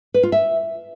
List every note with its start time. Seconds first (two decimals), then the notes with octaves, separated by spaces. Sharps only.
0.14 B4
0.23 F4
0.32 E5